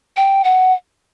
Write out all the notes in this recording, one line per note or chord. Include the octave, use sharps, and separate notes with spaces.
G5
F#5